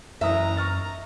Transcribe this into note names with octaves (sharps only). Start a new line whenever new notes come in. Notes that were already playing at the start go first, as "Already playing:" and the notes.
F#1 F#2 E3 D#4 E5 A#5 D#6
C#6 F6 A6